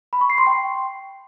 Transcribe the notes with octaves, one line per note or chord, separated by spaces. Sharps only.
B5
C#6
C7
C6
G5